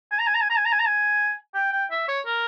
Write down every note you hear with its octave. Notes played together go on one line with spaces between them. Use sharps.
G#5
A#5
G#5
A#5
G#5
A#5
G#5
A#5
G#5
A#5
G#5
G5
G5
E5
C#5
A#4